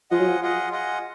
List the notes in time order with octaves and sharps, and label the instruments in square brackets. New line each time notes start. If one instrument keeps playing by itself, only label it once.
[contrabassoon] F3 [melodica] F4 G#4 D#5 F#5
[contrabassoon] F#3
F3
[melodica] F4 G#4 D#5 F#5
F4 G#4 D#5 F#5